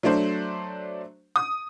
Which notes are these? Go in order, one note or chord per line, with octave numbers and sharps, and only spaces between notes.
F#3 A3 D4 C5
D#6